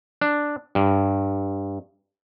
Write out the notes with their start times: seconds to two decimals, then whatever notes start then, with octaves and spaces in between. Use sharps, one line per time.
0.21 D4
0.75 G2